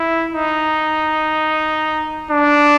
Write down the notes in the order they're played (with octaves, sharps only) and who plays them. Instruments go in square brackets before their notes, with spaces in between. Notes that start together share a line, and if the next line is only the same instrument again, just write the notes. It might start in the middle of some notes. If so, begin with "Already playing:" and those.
Already playing: [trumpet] E4
D#4
D4